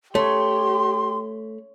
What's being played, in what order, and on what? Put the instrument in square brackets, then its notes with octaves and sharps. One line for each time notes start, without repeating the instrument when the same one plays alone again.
[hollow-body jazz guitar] A3 [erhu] G4 [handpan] C#5 [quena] C6